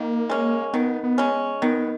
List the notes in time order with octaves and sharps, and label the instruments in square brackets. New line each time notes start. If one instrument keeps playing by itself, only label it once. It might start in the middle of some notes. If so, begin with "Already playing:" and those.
Already playing: [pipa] D#3 [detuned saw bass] A#3
[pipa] G#3 C#4
[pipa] D#3 [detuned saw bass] B3
[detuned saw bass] B3
[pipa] G#3 C#4
[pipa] D#3 [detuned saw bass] B3